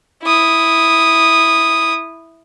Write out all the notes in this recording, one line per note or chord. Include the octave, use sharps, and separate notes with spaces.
E4 D#6